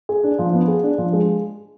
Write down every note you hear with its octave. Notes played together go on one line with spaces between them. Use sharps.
G#4
D4
F3
B3
G#4
D4
F3
G#3